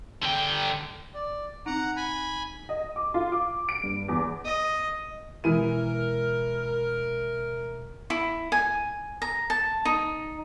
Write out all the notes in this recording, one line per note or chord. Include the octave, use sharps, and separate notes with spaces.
D3 G5
D5
C4 D#4 F#5 A#5
G#5 B5
D#5
D6
F4
D6
D7
G2
E2
D#5
B2 E3 G#3 E4 A#4 E5 D#7
E4
G#5
A#5
A5
D#4